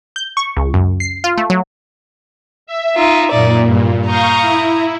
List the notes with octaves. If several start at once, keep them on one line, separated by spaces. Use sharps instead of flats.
G6
C#6
C#2
F#2
C7
F4
A3
F#3
E5
D#4 F4
F#2 A#2 D#4 D5
G2
F5 A#5 C#6 D#6 G6
E4